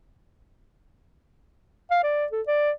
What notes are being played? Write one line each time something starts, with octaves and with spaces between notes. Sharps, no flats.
F5
D5
A4
D5